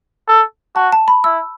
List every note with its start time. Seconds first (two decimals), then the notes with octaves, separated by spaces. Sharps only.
0.28 A4
0.75 F#4 A5
0.92 A5
1.08 B5
1.24 E4 E6